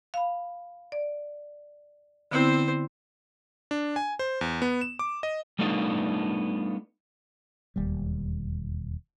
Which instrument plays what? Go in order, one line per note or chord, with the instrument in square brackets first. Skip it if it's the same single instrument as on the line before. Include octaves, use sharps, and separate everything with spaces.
[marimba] F5 B5
D5
[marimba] D3 B3 E4 [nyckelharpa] C4 C5
[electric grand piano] D4
G#5
C5
E2
B3
E7
D6
D#5
[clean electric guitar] G3 A3 B3 D4 D#4 F4
[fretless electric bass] E1 D#2 G3